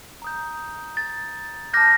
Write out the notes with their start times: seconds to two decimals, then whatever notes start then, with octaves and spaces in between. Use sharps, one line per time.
0.22 A#5 D#6 G6
0.97 A6
1.73 A5 D6 F6 G6 A#6